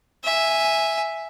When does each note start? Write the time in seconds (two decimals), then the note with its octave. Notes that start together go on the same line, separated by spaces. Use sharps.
0.24 E5 G#5